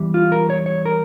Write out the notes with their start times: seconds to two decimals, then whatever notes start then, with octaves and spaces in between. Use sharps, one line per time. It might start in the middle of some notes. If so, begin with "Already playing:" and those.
Already playing: E2 E3 G3
0.14 F4
0.32 A#4
0.50 C#5
0.66 C#5
0.86 A#4